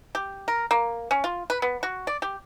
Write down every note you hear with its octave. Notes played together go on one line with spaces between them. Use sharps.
G4
A#4
A#3
C#4
F4
B4
B3
F#4
D5
G4